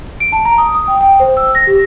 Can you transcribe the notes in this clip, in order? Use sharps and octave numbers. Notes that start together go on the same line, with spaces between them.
D7
A5
A#5
D#6
D#6
G5
G5
C5
E6
A#6
G4